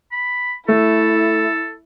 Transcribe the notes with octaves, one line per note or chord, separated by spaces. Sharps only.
B5
A3 E4 A4